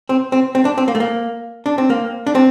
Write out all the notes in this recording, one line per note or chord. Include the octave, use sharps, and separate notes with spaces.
C4
C4
C4
D4
C4
A#3
A3
A#3
D4
C4
A#3
D4
C4